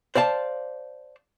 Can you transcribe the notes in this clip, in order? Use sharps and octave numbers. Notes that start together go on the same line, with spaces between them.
C5 D5 F5 A5